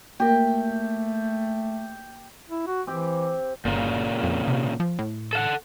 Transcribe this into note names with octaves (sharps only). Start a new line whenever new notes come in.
A3 A#3 G4 A#4
E4
F#4
E3 C4 G4
G1 A#2 C#3
F2
C3
F3
A2
A4 F5 F#5